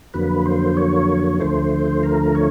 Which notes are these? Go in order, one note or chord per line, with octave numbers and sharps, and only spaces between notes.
F2 D3 F#3 A#3 B4
C5
C#5
D2 D3 F3 A3 C5
A#4
C#5